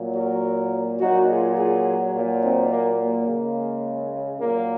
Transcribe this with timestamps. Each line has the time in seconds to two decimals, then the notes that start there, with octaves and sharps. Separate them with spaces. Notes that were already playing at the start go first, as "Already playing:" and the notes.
Already playing: A#2 F#3
0.16 F#4 A#4
1.00 A#2 F#3 D#4 F#4
1.29 F4 G#4
1.57 F4 G#4
2.14 A#2 F#3
2.42 C4 D#4
2.70 A#3
2.99 A#3
3.27 C#3 G#3
4.40 A#2 F#3 A#3